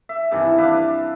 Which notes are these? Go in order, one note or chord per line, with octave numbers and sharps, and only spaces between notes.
E5
G2 C3 D#3 E3
D4 B4 E5 F5